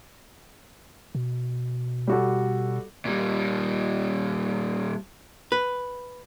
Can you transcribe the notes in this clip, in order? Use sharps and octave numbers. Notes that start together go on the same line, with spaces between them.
B2
G3 F#4 A4
A#2 G3
B4